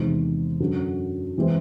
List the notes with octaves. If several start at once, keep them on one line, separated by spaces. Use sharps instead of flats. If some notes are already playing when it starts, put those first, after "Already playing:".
Already playing: E2 C3 D#3 G#3
F#2 D3 F#3
E3 G#3 C4